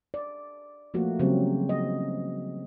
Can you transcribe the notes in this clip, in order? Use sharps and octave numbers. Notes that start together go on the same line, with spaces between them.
D5
F3 A3 A#3 F#4
C#3 F#3 G3 C4
D#5